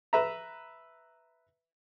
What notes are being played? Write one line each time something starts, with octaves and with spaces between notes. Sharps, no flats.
B4 E5 A#5